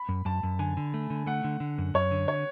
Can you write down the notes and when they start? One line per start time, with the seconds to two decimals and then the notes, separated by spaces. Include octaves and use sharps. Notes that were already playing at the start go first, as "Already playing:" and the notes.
Already playing: B5
0.09 F#2
0.25 F#2 A5
0.43 F#2
0.59 D3 G#5
0.77 D3
0.94 A3
1.10 D3
1.26 A3 F#5
1.44 D3
1.60 D3
1.78 F#2
1.94 F#2 C#5
2.11 D3
2.28 C#5